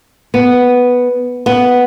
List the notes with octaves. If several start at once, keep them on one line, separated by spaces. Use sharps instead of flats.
B3
B3